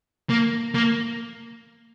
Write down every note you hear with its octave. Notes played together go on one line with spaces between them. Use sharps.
A#3
A#3